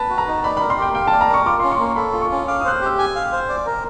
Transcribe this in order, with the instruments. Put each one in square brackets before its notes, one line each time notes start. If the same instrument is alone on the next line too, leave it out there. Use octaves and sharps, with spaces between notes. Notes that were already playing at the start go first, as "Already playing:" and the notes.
Already playing: [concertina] B4 [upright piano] A5
[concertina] F#4
[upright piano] A#5
[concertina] D#4
[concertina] D5 [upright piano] B5
[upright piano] B5
[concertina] A#4
[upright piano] C6
[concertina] G4 [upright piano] G5
[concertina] F5 [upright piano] G5
[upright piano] A5
[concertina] D5
[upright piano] A#5
[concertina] A#4 [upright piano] C#6
[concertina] F4 [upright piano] D6
[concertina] C#4 [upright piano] C6
[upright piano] C#6
[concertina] A#3
[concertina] A4 [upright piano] B5
[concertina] F4
[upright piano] C#6
[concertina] C#4
[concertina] F5 [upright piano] D6
[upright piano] D#6
[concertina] C5 [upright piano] F#6
[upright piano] F6
[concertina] G4 [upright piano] E6
[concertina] G#5
F5
C5
D5
A#4